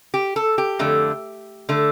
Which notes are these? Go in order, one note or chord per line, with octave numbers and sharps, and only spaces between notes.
G4
A4
G4
F2 D3 A3
D3 A3